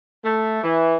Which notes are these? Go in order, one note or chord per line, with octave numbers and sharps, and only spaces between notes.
A3
E3